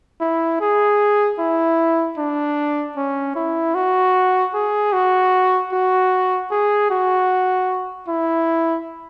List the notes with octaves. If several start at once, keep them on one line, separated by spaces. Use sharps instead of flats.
E4
G#4
E4
D4
C#4
E4
F#4
G#4
F#4
F#4
G#4
F#4
E4